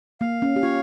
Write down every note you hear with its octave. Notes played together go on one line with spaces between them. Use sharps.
A#3 F5
C#4
G4
F4 C#5